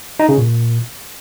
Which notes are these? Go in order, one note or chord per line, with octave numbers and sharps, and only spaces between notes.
D#4
C#3
A#2